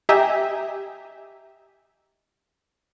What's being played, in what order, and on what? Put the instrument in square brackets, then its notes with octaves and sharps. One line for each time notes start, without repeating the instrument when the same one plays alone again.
[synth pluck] G4 D#5 E5 G5 G#5 A#5